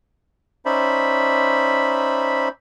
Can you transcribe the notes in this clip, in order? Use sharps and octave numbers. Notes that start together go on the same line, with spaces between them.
C#4 D#4 C5 D5 E5 B5